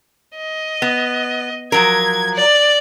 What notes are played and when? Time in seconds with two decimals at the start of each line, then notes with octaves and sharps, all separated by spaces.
0.36 D#5
0.82 B3
1.72 F3 F#3 A#4 G#6
2.35 D5